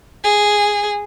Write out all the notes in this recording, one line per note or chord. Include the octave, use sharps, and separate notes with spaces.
G#4